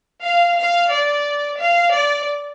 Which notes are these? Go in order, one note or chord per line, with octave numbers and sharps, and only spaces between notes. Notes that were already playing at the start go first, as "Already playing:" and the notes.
F5
F5
D5
F5
D5